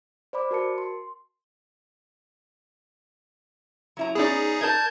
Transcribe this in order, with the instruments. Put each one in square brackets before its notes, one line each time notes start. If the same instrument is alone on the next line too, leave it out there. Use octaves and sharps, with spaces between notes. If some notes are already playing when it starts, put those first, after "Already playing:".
[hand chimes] C5 D5 B5 D6
F#4 A#4 A5 C#7
C6
[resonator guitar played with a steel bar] F#3 E4 A#5
[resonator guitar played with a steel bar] B3 C#4 D5 [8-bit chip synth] D#4 G#4
[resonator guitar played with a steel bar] A#4 D5 [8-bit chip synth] A5 G6 G#6